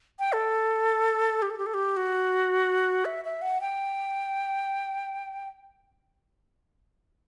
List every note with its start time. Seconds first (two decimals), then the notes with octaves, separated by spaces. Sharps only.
0.19 G5
0.33 A4
1.42 G4
1.50 A4
1.58 G4
1.66 A4
1.74 G4
1.97 F#4
3.05 E5
3.25 E5
3.42 F#5
3.61 G5